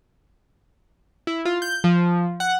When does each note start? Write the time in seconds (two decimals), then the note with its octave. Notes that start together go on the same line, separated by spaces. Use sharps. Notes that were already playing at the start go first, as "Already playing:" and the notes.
1.27 E4
1.45 F4
1.62 G6
1.84 F3
2.40 F#5